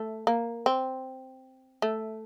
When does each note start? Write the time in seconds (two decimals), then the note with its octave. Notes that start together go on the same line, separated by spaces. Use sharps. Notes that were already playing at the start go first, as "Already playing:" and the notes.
Already playing: A3
0.27 A#3
0.66 C4
1.82 A3